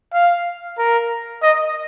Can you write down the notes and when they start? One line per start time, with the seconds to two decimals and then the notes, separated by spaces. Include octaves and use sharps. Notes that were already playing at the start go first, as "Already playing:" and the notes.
0.13 F5
0.78 A#4
1.43 D#5